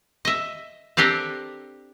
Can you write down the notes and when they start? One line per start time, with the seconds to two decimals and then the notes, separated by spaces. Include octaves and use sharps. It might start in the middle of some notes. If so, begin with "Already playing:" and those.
0.25 D#5 E5
0.97 C4 D4 G4 A4 A#4